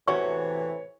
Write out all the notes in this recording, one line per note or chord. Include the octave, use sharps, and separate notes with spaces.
E2 A2 C3 E3 F#4 C#5 C#6